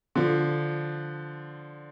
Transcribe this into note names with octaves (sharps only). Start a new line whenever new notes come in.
D3 F3